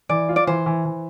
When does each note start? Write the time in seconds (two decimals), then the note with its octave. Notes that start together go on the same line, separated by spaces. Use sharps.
0.09 E3 D5
0.29 F4
0.36 D5
0.47 E3 C5
0.66 E3
0.85 E3